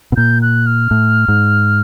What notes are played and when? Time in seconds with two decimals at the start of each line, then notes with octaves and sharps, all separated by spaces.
0.12 B2
0.16 A#2 G6
0.42 F#6
0.66 F6
0.91 A2
1.28 G#2